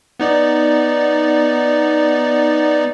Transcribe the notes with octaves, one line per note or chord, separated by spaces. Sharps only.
B3 D#4 D5